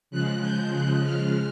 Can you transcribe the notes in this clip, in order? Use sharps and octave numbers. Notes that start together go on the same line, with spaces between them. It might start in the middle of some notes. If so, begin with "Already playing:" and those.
C#3 F3 G#3 F#6
G6
F#6
F6